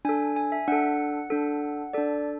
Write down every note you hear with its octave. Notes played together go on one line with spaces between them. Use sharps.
D4 A4 G#5
G#5
E5
D4 A4 F#5
D4 A4
D4 A4 D5